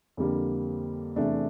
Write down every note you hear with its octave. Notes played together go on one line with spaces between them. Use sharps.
F2 D3 G3 A#3
E2 C3 E3 A3 D4